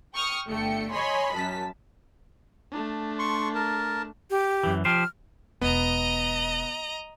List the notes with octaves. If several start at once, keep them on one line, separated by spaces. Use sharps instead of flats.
G5 C#6 D#6 F6
G1 D3 A3 G5 C#7
C#5 D#5 G#5 B5 C6
F#2 A5 B6
A3 D4
C6 C#6
A#4 A5
G4
F#2 E3
F3 G4 C5 F6
E1 B3 D#5 A#5